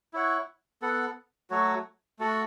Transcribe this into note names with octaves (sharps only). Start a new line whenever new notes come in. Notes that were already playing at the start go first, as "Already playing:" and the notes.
E4 C#5 F#5
B3 A4 F#5
F#3 A3 F#4 C#5
A3 F#4 A4 F#5